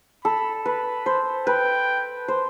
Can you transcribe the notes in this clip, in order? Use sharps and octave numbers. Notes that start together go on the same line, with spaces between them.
A4 B5
B4 B5
C5
B4 G5
C5